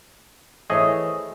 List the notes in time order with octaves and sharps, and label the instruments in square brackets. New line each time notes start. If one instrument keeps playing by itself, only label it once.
[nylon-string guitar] E3 C5 C#5 [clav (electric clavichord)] A3 G#4 D#5